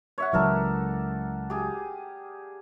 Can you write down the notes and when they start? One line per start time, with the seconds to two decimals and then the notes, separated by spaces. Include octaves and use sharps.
0.18 C#5 E5 F#5
0.33 C#2 E3 F#3 A4 A#4 D5
1.50 G4 G#4